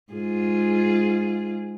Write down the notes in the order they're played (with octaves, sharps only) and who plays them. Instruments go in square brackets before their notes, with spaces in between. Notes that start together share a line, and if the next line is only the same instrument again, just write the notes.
[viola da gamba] G#2 F4 G#4